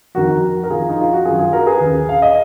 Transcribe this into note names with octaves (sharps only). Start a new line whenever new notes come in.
F2 D#3 F#4 A#4
A#4
F2 D#3 F4 G#4
D#4
F4
F#4
F#2 D#3 F4 G#4
F4 G#4
F#4 A#4
G#4 B4
D#2 C#3
F5
D#5